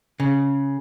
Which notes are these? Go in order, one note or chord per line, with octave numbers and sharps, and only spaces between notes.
C#3